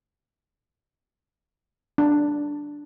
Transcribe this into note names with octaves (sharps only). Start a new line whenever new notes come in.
D4